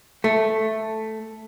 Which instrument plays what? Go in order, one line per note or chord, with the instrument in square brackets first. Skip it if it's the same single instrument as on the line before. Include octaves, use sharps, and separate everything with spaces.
[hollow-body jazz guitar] A3